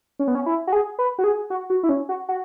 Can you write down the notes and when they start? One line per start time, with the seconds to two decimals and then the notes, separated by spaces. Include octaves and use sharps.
0.19 C#4
0.28 B3
0.35 C#4
0.46 E4
0.67 F#4
0.73 G#4
0.99 B4
1.19 F#4
1.24 G#4
1.50 F#4
1.70 F#4
1.83 E4
1.89 C#4
2.09 F#4
2.29 F#4